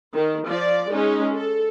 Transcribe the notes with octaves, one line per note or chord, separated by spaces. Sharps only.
D#3
F3 D5
G#3 C#4 D#4
A4